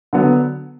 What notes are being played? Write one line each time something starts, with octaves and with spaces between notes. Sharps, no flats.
D3 F#3 B3